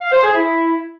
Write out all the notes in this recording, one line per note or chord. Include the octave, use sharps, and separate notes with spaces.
F5
C5
G#4
E4